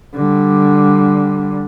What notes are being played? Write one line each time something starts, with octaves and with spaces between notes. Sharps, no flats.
D3 G3